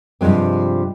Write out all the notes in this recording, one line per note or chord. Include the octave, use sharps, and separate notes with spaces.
G2 C3 F3 G#3 C4